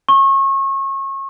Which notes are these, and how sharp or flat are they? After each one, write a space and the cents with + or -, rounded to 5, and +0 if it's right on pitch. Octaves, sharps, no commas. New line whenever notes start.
C#6 -30